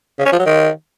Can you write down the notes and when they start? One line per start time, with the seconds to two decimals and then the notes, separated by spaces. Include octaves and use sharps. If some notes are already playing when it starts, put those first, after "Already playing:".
0.19 C#3
0.26 C#4
0.33 F3
0.39 F#3
0.46 D#3